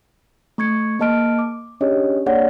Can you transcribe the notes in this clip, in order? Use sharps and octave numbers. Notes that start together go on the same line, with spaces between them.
A3 C#6 G#6 C#7
A#3 G#4 D#5 A5 F6 D7
D6
C#4 D4 G4 G#4 C#5 D#5
A#3 D4 G#4 C#5 D5 F#5